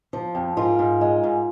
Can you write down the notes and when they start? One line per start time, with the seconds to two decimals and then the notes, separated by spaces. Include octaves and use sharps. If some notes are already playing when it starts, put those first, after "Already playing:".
0.13 F3
0.35 F2
0.57 G#2 F4 A#4
0.79 G#2
1.01 G#3
1.23 G#2